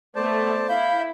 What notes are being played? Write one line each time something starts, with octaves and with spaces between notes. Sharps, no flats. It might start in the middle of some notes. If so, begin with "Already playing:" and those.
A3 B3 C5 D5 A5
E4 F5 B5 G6